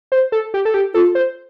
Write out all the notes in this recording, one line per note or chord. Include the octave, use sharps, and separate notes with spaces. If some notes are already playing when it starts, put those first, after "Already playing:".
C5
A4
G4
A4
G4
F4 A4
C5